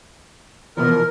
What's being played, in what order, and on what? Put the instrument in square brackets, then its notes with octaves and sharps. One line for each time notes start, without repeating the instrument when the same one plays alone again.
[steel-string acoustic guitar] B2 E3 F3 [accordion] A#4